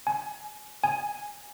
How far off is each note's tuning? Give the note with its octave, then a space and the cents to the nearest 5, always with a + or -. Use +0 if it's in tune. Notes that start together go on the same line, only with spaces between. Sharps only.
G#5 +25
G#5 -5